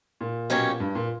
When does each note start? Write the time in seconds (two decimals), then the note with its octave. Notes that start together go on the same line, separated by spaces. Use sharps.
0.21 A#2
0.50 B2 F#3 C#4 G4 C#5
0.80 G2
0.95 A#2